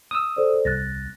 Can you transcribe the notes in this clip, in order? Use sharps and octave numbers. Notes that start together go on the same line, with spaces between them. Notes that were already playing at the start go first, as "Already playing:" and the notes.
D#6 E6
A4 C5 D5
C2 F#6 A6 A#6